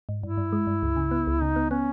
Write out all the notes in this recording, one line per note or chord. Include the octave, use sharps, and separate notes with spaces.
G#2
G2 E4
G2
G#3
G2
C#2
C#3
B3
C#2
C#3 D#4
B3
B3 C#4